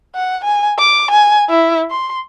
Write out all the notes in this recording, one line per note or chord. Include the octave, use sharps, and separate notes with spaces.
F#5
G#5
D6
G#5
E4
C6